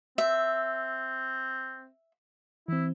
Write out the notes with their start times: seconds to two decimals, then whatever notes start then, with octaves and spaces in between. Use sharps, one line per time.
0.18 C4 E5
2.68 E3 C4 E4